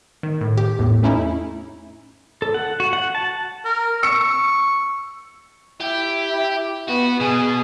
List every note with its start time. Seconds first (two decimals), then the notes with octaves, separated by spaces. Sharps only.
0.23 D#3
0.41 A2
0.58 G4
0.79 E2 A2
1.03 A3 C#4 D#4 E4
2.42 A4
2.54 F#5
2.80 F#4
2.93 F#5
3.15 A5
3.65 A#4
4.03 C#6 E6 C#7
5.81 E4 G4
6.88 B3 F#4
7.20 B2 G#4